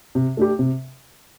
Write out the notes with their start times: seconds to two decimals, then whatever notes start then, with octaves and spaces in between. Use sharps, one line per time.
0.15 C3
0.37 A3 D4 G4
0.59 C3